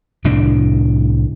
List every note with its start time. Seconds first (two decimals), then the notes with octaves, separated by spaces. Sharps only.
0.24 C2 A2 D#3 D4